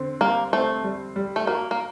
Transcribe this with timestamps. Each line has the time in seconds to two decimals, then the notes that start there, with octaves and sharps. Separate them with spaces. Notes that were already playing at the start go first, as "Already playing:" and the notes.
Already playing: D3 C4
0.21 G3 A#3
0.53 A3 C4
0.84 G3
1.16 G3
1.36 A3
1.47 A#3 F#4
1.71 A#3